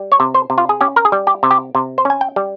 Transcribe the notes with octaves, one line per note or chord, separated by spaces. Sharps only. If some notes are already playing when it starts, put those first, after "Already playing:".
Already playing: G3
C#5
C3
C5
C3
F4
G#4
C#4 G4
A#4
G#4
G3
G4
C3
G4
C3
C5
C#4 G#5
G5
G3